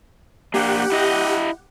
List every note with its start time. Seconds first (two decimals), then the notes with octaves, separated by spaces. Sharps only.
0.54 A#3 D4 G4 F#5
0.92 E4 D#5